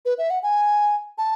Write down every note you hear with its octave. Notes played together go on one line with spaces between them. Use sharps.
B4
E5
F#5
G#5
A5